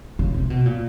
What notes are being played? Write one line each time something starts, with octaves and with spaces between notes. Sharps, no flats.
C#3
C3
B2
A#2